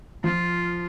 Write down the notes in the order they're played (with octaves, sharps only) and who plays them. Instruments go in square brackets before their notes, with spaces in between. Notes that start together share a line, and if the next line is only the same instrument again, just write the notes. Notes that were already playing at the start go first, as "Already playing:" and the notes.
[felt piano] F3 [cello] F4